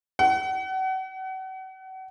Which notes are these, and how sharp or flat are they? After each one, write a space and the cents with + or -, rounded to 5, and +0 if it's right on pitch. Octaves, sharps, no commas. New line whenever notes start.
F#5 +35